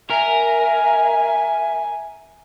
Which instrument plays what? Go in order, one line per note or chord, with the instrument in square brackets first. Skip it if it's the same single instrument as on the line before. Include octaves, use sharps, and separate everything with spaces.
[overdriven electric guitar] A#4 [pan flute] E5 [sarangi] G#5